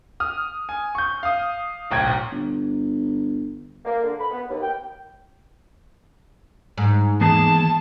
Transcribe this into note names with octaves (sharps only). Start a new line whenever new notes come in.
D#6 F6
G#5
C#6 G6
F5 D#6
D1 B1 G5 G#6
G1
A#3
D3
B5
B3
D#2
G5
G#2
D#3 E3 A#3 B3 G#4 A5